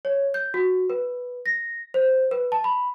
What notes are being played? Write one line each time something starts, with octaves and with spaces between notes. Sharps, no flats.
C#5
G6
F#4
B4
A#6
C5
B4
A5
B5